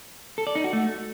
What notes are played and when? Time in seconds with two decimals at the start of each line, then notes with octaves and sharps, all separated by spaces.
0.38 A4
0.47 D5
0.55 D#4
0.64 F#4
0.73 A3